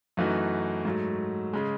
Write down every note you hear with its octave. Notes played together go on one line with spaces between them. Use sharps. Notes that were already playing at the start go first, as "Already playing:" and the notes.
F#2 E3 A3 D#4 F#4
G#2 F#3 A3
C#3 G#3